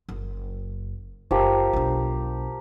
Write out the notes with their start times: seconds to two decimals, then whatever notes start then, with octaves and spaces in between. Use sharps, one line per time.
0.09 F#1
1.31 F#1 F3 G4 A#4
1.73 B1 D4